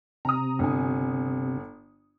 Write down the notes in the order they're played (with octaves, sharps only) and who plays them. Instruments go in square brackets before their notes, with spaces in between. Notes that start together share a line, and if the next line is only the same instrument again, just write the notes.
[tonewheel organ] C3 [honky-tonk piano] A#5 D#6
[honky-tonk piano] G1 G#5